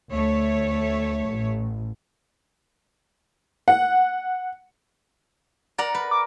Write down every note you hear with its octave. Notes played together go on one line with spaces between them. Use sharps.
D2 A3 C#5
A1 A2
F#5
A#4 D5 F#5 A#5
B4
D6